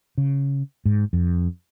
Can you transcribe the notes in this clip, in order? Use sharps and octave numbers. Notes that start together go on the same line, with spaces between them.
C#3
G#2
F2